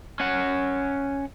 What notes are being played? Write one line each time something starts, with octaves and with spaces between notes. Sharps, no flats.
C#4 F#5